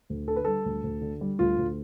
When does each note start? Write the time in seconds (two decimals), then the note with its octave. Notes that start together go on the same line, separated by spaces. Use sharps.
0.10 D2
0.28 D3 A4
0.36 B4
0.45 G3 A4
0.65 D2
0.83 D2
1.02 D3
1.21 G3
1.39 D2 F4
1.58 D2